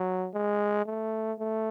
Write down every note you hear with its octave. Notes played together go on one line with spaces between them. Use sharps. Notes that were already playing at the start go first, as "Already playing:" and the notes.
Already playing: F#3
G#3
A3
A3